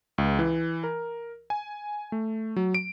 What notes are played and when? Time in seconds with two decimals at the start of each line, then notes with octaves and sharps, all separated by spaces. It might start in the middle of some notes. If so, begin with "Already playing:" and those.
0.18 C#2
0.39 E3
0.84 A#4
1.50 G#5
2.12 A3
2.56 F#3
2.75 D7